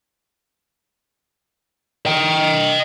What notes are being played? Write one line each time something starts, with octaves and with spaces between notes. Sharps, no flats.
D#5 G5